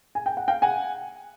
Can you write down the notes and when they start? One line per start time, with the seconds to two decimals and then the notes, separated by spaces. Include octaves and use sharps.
0.15 G#5
0.26 G5
0.37 F#5
0.48 F5 G5
0.62 F#5 G#5